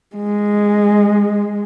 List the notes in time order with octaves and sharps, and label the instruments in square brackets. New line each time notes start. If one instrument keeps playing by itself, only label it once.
[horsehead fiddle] G#3